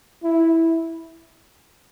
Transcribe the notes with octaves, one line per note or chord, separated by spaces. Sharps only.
E4